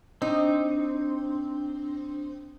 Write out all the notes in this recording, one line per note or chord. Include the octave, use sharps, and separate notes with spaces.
C4 D4 D#4